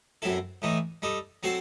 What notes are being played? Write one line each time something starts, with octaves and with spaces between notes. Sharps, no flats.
F#2 F#3 C4 E4 A4
A2 E3 A3 D#4
G3 D#4 A4
F#3 C4 F#4 A4 C5